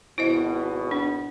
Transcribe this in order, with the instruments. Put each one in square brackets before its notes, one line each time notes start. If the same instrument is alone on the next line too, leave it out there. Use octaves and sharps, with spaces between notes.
[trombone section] G#1 B2 [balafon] E4 C5 D#5
[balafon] D4